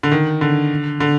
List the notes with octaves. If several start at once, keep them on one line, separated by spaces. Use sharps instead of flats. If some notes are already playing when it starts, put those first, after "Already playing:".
D3
D#3
D3
D3